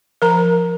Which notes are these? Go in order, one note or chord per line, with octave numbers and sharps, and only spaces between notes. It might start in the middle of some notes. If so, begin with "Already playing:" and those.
F3 A#4 A#5